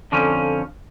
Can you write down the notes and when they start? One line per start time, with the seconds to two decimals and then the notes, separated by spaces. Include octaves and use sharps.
0.12 F2 D3 F3 C#4